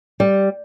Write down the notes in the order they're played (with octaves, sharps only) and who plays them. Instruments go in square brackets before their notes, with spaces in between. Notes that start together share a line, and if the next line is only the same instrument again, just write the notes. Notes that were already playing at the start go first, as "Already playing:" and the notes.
[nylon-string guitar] G3